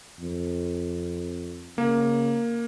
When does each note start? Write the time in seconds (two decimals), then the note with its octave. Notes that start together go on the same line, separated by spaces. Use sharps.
0.19 F2
1.78 C#3 A#3